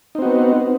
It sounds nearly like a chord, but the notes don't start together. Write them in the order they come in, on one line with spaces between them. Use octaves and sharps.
D#4 C4 F#4 B3